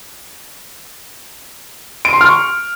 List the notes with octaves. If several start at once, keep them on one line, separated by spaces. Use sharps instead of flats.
D7
C6
F6
C#6